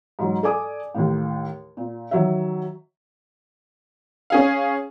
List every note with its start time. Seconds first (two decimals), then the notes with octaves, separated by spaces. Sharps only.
0.19 G#2 F#3
0.43 A4 D5 G#5 D6 D#6
0.94 D#2 A2
1.77 A#2
2.11 D#3 F#3 E5
4.30 C#4 G#4 F5